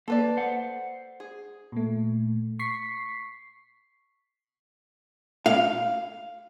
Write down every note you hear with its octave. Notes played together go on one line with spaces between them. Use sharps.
A#3 A4 B4 D5
C5 F#5
G#4
A#2 A3
C#6 B6 C7
F5